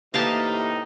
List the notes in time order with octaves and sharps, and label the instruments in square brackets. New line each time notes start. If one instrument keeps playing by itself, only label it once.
[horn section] A2 C3 D#4 [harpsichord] E3 A#3 [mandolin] G4 [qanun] F5 A5